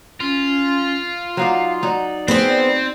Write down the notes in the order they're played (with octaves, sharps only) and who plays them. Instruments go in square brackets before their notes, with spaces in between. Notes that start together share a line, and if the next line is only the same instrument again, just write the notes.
[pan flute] C#4 [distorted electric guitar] F4
[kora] F#3 D#4 D5 [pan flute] F5
[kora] F#3 D#4 [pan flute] D5
[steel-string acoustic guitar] B3 G#4 C5 [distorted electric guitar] C4